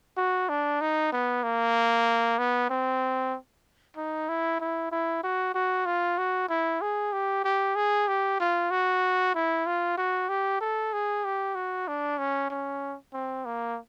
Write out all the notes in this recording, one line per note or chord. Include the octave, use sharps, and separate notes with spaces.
F#4
D4
D#4
B3
A#3
B3
C4
D#4
E4
E4
E4
F#4
F#4
F4
F#4
E4
G#4
G4
G4
G#4
G4
F4
F#4
E4
F4
F#4
G4
A4
G#4
G4
F#4
D4
C#4
C#4
C4
A#3